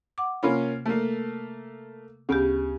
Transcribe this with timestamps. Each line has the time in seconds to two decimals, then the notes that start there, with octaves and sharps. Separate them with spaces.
0.18 F#5 D6
0.43 C3 A#3 C#4 F4 B5
0.85 A3 A#3
2.29 D2 C#3 B3 G4